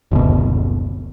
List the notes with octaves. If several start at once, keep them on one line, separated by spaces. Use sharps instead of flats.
F#1 D2 B2